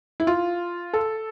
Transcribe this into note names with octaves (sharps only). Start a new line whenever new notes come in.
E4
F4
A4